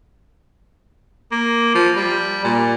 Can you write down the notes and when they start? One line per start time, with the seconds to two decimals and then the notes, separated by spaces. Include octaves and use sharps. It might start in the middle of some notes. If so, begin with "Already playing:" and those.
1.32 A#3
1.75 F3
1.96 G3
2.44 A#2